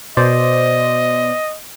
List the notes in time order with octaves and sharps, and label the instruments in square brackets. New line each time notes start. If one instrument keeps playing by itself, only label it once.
[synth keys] B2 C5 D5 [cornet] D#5